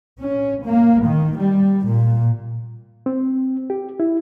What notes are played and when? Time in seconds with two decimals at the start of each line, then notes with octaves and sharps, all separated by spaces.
0.19 C#4
0.64 A#3
1.05 D#3
1.38 G3
1.86 A#2
3.06 C4
3.70 G4
4.00 E4